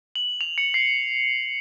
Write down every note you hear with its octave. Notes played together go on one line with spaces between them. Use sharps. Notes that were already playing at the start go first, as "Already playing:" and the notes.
F#7
F7
C#7
C7